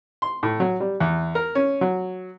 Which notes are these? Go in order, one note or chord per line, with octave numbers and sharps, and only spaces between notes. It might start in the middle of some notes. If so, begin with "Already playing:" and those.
C6
A2
F#3
G3
E2
A#4
C#4
F#3